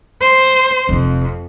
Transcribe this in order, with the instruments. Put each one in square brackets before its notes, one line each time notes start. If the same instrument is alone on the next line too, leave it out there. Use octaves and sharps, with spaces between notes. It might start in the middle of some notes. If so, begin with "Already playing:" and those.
[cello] C5
[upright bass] F1 C3 [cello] F2